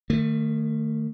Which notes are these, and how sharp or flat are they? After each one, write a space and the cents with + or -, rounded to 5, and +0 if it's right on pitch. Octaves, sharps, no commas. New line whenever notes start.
D#3 -30 A3 +20